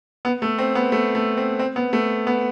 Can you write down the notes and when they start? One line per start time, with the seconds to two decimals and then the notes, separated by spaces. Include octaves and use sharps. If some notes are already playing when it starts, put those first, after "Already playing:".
0.25 B3
0.42 A3
0.58 C4
0.75 B3
0.92 A3
1.15 A3
1.37 C4
1.59 C4
1.76 B3
1.93 A3
2.27 B3